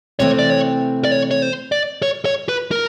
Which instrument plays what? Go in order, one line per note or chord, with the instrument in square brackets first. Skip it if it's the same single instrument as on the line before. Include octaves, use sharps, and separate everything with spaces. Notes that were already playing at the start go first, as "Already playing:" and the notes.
[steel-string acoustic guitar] C3 E3 A3 C4 [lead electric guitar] C#5
[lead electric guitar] D5
C#5
D5
C#5
C#5
C5
D5
C#5
C#5
B4
A#4